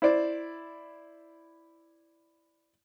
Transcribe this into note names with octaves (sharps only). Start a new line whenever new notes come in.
E4 C5 D5